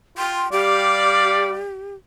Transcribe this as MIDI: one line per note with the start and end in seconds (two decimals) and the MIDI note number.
0.18 0.44 65
0.18 0.48 79
0.18 0.44 84
0.52 1.60 55
0.52 1.95 67
0.52 1.61 74
0.52 1.60 77